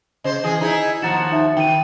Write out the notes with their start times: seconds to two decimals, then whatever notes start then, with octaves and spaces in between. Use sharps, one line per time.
0.24 C#3 C5 D#5
0.44 E3 G#4
0.61 D#4 E4 G#4
1.02 D#2 F3 F#4 A#5 A6 E7
1.32 D#4 E5
1.57 D#3 G5 D#7